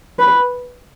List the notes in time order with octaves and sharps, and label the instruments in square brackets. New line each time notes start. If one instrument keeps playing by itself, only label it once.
[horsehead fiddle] B4